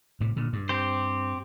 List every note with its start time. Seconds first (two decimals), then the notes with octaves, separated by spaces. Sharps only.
0.20 A2 C3
0.36 A#2 D3
0.53 G2
0.69 C4 G4 C5